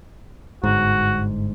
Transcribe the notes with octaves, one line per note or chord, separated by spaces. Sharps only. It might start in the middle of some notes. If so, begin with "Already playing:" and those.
G1 G#2 F#4